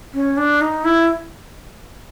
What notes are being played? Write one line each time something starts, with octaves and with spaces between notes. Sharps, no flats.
C#4
D4
D#4
E4